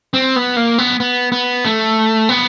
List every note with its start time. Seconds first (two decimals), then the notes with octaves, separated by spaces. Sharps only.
0.14 C4
0.36 B3
0.56 A#3
0.78 B3
1.00 B3
1.32 B3
1.65 A3
2.29 B3